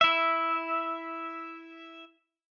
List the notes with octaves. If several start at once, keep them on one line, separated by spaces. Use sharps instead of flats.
E4 E5